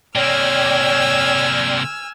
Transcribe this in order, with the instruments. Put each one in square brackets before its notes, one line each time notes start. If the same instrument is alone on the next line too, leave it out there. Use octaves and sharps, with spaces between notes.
[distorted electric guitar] C3 A#3 [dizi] C#5 [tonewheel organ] D5 G5 [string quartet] G#5 E6 F6